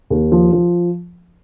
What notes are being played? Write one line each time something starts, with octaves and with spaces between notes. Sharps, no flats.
D#2
F3
F3